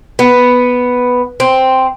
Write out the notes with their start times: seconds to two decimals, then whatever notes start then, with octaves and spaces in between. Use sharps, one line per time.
0.19 B3
1.40 C4